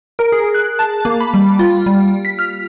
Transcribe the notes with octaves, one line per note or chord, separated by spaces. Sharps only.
A#4
G#4
F#6
A5
A#3
B5
G3
F4
G3
B6
F6